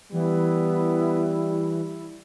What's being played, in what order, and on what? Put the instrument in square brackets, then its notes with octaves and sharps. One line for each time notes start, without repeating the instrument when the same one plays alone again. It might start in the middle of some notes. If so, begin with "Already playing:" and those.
[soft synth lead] E3 [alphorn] G3 [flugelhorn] B3 [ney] E4